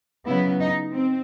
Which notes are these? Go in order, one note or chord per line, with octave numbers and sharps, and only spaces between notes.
C#3 F#3 B3 E4
D#4
C4